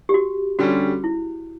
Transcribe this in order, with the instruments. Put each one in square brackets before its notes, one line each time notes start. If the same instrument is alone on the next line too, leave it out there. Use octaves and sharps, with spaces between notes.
[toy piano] G4
F#4
[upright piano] D3 G3 C#4 [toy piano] F#4
[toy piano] E4